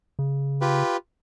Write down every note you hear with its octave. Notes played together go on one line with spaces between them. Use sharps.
C#3
F4 G4 B4